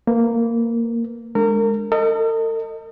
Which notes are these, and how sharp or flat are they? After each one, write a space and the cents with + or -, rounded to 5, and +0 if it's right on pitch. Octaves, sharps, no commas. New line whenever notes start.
A#3 -10 B4 +0
G#3 +0 D4 +0 A#4 -30
A4 +45 D#5 -5